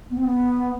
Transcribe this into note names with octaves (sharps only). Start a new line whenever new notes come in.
B3
C4
B3